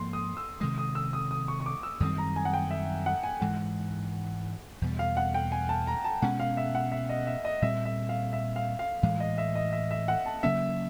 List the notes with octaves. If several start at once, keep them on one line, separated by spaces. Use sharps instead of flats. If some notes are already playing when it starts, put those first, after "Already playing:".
Already playing: G#2 F3 A#3 C6
D#6
E6
C3 D#3 G#3 D#6
D#6
E6
D#6
D#6
C#6
C#6
D6
E6
F#2 D#3 G3 C4 D#6
A#5
G#5
F#5
G5
E5
F#5
G#5
G#2 E3 G#3 F#5
E2 B2 G3
F5
F#5
G5
G#5
A5
A#5
A5
B2 G#3 C#4 F#5
F5
E5
F#5
E5
D#5
E5
D#5
A#2 G3 C4 E5
E5
F5
E5
F5
F5
A2 E3 G#3 F5
D#5
E5
D#5
E5
E5
F#5
A5
C#3 F#3 A#3 C#4 E5